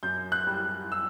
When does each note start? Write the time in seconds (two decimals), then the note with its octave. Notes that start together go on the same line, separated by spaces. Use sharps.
0.03 F#2 G6
0.32 F#6
0.47 G3
0.92 E6